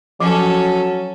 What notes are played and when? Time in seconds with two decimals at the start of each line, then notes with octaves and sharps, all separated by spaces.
0.20 F3 F#3 C#4 A4